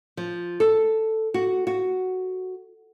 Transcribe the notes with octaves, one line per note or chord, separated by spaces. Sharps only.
F3
A4
F#4
F#4